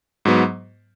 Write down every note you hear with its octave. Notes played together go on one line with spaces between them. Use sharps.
G#2 F#3 B3